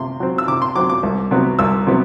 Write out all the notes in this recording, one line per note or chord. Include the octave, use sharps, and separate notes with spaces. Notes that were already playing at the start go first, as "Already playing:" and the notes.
Already playing: C3 C6
F#3 C4
E6
C3 D6
C6
F#3 C4 D6
D6
C2
C3 F#3 B3
C2 E6
C3 F#3 B3